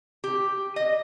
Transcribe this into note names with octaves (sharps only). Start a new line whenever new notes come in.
G4
D#5